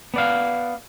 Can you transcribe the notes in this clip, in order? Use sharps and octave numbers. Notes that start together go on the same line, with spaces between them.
B3 D5 F5